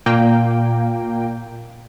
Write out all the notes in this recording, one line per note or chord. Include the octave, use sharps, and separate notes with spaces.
A#2 A#3 G5